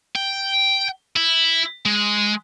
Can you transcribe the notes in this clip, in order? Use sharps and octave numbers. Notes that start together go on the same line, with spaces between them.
G5
E4
G#3